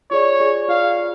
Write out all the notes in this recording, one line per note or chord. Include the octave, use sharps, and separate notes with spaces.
F4 G#4 C#5 D5
F4 G#4 D5
F4 G#4 D5 F5
F4 G#4